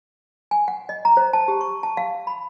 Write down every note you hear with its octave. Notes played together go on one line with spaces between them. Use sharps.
G#5
F#5
D#5
A#5
C5
A5
G4
C#6
A5
F5
B5